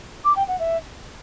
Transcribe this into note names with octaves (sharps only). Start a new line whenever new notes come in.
D6
G5
F#5
E5